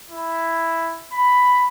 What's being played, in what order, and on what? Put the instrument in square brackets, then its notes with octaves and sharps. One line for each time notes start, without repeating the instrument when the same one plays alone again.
[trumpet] E4
B5